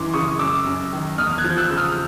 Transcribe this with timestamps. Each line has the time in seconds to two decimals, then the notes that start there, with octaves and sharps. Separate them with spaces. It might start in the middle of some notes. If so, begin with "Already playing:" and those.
Already playing: F#2 E3 C6 D6
0.14 C#3 C#6 D#6
0.39 F#2 D6 E6
0.66 F#2
0.92 D#3
1.18 E2 D#6 F6
1.38 F#6 G#6
1.44 F3
1.50 G6
1.57 E6 F#6
1.70 C#3
1.77 D#6 F6